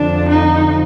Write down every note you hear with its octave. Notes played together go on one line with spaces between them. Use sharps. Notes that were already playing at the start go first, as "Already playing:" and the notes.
Already playing: F2 D3 F3 D4
D#4